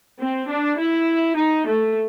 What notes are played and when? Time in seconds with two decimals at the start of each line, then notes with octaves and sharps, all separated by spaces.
0.19 C4
0.48 D4
0.78 E4
1.36 D#4
1.66 A3